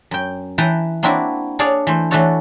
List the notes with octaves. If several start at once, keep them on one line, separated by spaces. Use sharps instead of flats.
F#2 G5
E3 B4 G5 A5 A#5
A#3 C4 D4 E4 F#4
D4 G#4 C#5 D5 F5
E3 A3 C5
E3 A3 D4 F#4 A4 C#5